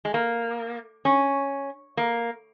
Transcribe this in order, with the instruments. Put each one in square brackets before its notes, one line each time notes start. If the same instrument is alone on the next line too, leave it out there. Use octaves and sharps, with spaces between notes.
[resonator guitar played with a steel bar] G#3
A#3
C#4
A#3